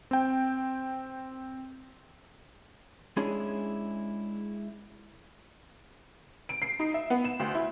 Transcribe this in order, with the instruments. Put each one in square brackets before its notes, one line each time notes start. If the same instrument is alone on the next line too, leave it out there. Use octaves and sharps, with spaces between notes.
[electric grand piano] C4 G5
[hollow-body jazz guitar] G#3 C#4 D4 E4 G#4
[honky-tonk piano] D7
C7
D#4
E5
B3
E7
D2
E4